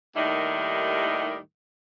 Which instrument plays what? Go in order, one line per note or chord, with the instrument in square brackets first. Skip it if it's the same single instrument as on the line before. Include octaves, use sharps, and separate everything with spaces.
[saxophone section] D#2 A2 D#3 G3 D#4 E4